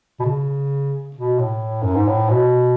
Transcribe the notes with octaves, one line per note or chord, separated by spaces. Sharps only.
B2
C#3
B2
A2
F#2
G#2
A2
B2